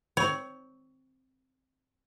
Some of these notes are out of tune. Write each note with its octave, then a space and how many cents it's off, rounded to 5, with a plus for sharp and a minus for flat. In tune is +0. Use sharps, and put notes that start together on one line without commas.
C4 +0 C#5 +15